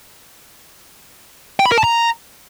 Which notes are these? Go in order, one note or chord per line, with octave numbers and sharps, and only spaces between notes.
G5
B5
A#4
A5
A#5